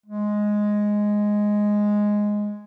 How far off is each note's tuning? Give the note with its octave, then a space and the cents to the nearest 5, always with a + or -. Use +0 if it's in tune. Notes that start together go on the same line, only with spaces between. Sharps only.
G#3 +0